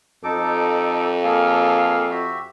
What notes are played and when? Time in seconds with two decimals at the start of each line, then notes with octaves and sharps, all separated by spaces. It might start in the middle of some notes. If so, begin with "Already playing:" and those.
0.24 F2 D#4 A4 D6
1.24 A#3 G#4 A4 F5
2.10 F#4 G4 E5